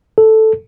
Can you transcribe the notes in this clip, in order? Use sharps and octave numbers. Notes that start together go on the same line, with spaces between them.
A4